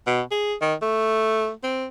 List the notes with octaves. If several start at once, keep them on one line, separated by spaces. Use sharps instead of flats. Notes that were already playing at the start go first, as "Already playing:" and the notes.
B2
G#4
D#3
A3
C4